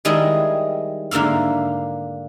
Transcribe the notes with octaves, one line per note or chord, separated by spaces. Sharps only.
D#3 G3 G#3 E4 G#4 D#5
G#2 D3 A#3 E5 F5